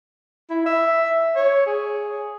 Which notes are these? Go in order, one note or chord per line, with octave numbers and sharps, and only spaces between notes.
E4
E5
C#5
G#4